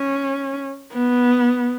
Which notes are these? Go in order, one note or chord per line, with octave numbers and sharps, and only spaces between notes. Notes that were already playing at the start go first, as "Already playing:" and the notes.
Already playing: C#4
B3